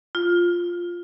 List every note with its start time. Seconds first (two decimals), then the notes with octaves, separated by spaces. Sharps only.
0.15 F4